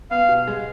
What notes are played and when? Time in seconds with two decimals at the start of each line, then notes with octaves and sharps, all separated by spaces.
0.11 B3 F5
0.29 B2
0.48 G#3